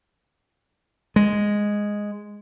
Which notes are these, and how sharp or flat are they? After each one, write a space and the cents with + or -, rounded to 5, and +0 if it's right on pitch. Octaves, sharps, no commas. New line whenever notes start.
G#3 -5